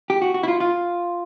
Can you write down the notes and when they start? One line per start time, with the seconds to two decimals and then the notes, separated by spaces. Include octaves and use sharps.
0.10 G4
0.22 F#4
0.34 F#4
0.43 E4
0.48 F4
0.60 F4